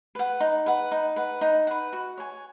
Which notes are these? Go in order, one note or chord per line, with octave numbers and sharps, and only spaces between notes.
B4 F#5
D#4
B4 F#5
D#4
B4 F#5
D#4
B4 F#5
F#4
C#5 G#5